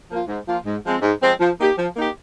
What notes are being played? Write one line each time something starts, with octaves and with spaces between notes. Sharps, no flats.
F3 A#3 F4
G#2
F3 A#3 F4
G#2
F3 G#3 C4
G#2
F3 G#3 C4
F3
A#3 D#4 G4
F3
A#3 D#4 G4